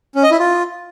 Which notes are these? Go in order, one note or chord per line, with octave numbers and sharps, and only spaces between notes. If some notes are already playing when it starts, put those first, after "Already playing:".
C#4
D#5
E4
F4